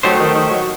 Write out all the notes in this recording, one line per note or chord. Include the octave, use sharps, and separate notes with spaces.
F#3 A3 D#4 G4 C5
D#3
D#3
F#3